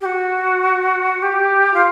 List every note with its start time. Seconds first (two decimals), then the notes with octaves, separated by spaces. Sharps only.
0.01 G4
0.05 F#4
1.22 G4
1.74 F4